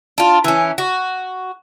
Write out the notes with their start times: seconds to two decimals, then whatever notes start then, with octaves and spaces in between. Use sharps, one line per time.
0.18 D4 F4
0.44 E3 C#4
0.78 F#4